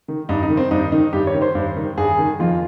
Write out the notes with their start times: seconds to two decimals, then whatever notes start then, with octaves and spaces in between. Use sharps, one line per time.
0.08 D#3
0.29 G2 D#4
0.43 D#4
0.50 D#3
0.57 C4
0.71 G2 D#4
0.92 D#3 D#4
1.13 G2 G4
1.27 C#5
1.34 D#3
1.42 C5
1.55 G2
1.77 D#3
1.98 G2 G#4
2.19 D#3
2.40 F2 F4